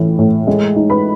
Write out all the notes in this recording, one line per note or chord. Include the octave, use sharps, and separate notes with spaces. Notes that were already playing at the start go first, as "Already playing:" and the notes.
Already playing: A2 E3
A2
G#3
D#4
B4 B5